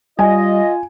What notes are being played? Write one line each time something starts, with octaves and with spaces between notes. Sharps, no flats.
G3 F4 D#5 G#5